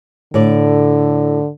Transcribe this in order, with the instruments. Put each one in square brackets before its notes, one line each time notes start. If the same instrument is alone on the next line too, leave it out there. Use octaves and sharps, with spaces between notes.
[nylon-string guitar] A2 D5 [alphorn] D3